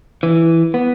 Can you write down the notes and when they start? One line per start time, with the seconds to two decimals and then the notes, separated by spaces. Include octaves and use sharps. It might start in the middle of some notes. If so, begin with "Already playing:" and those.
0.23 E3
0.74 B3